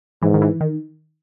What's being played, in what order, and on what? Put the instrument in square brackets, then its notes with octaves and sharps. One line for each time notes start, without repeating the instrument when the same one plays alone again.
[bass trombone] G#2 [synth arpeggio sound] E3
[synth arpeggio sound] D#3
E3
D#3